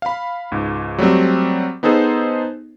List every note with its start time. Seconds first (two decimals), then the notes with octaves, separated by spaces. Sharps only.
0.02 F5 B5
0.51 C#2 G#2
0.98 F#3 G3 A3 C4
1.83 B3 D#4 G#4 A4 C5